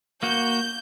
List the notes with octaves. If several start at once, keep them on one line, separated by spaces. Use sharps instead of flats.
A#3 F#4 G6